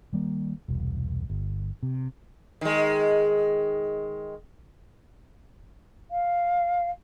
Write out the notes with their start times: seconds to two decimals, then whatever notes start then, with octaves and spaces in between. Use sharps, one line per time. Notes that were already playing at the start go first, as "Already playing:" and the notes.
0.13 D#3 G3 A#3
0.68 E1 C2
1.30 G1
1.83 C3
2.61 D#3 G#3
6.10 F5